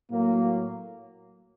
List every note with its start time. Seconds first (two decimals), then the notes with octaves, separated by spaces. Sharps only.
0.10 A2 F#3 A#3